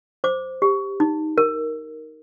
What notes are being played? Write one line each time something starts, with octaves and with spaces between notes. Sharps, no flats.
C5 D6
G4
D#4
A#4